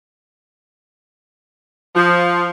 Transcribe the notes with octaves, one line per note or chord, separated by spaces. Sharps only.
F3